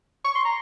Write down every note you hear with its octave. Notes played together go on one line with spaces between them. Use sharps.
C#6
C6
A#5